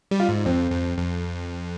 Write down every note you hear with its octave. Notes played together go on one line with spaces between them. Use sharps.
G3
F4
G#2
F2 C4
F2
F2